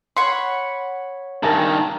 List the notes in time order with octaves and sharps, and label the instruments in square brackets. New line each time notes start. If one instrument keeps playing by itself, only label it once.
[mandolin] C#5 F#5 B5 [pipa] C6
[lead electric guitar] G2 D#3 [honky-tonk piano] A#4 G#5 A5